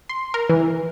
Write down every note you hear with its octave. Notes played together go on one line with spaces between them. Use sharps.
C6
A#4
E3